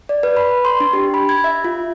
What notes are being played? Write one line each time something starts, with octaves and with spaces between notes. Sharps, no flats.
D5
B4
B5
C6
D4
G4
B5
G#6
E5
F4